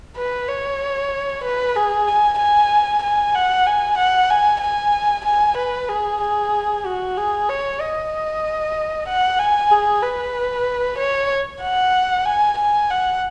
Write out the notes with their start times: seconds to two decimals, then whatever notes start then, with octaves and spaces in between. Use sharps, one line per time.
0.17 B4
0.49 C#5
1.44 B4
1.76 G#4
2.08 G#5
2.39 G#5
3.03 G#5
3.35 F#5
3.67 G#5
3.98 F#5
4.31 G#5
4.62 G#5
5.25 G#5
5.57 B4
5.89 G#4
6.21 G#4
6.86 F#4
7.17 G#4
7.49 C#5
7.80 D#5
9.09 F#5
9.39 G#5
9.72 G#4
10.03 B4
10.98 C#5
11.62 F#5
12.26 G#5
12.58 G#5
12.90 F#5